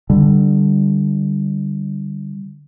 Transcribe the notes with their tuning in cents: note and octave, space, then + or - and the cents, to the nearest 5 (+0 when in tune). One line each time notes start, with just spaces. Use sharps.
D3 +10 G3 +0